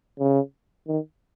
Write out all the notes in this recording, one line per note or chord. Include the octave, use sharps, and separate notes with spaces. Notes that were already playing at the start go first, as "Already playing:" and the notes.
C#3
D#3